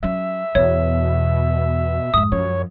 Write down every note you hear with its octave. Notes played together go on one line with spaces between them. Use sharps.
F#3 C#4 E5
E2 B2 E3 C#5
F2 G#2 D#6
F#2 F3 C#5